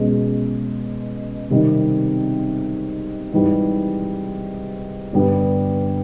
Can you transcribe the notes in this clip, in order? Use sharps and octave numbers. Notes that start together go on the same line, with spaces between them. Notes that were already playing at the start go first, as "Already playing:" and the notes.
Already playing: B2 G#3 C#4
C3 D#3 G3 C4
G#2 E3 G3
G2 D3 G3 B3